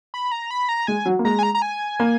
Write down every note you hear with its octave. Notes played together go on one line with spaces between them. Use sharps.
B5
A#5
B5
A#5
G#3 G#5
F#3
A#3
G#3 A#5
G#5
A#5
A#5
G#5
A#3